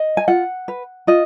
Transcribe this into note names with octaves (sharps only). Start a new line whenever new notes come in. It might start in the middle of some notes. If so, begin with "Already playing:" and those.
Already playing: D#5
G#5
F4 F#5
B4
F4 D#5